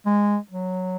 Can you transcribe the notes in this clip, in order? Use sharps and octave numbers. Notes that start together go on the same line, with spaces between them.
G#3
F#3